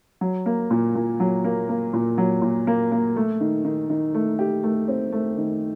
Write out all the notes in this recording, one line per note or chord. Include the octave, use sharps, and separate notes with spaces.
F#3
A#3
A#2
A#2
F#3
A#3
A#3
A#2
F#3
A#2
A#3
A#3
A3
D#3
D#3
D#3
A3
G4
A3
C4
A3
D#3